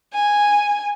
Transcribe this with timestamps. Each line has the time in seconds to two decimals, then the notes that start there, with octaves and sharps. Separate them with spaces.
0.13 G#5